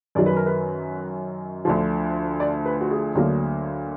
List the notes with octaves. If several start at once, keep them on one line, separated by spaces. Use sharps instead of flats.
F#2 D#3 F#3 D5
B4
A#4
B4
D2 D3 F3
D5
B4
F#4
G#4
D2 D3 F#3 A#3